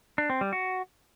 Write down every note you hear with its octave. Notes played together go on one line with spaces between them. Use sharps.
D4
C4
G3
F#4